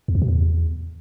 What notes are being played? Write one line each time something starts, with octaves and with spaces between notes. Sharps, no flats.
E2
F2
B2
E2